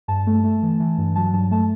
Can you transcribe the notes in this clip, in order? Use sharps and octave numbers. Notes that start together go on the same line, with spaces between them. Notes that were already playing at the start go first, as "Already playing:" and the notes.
G2 A5
A3
A3
E3
E3
G2
F#3 A5
G2 A5
A3 A5